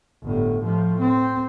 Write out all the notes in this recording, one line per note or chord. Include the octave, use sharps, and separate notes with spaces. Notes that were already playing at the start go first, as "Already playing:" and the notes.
G1 A2
A2 F3
C4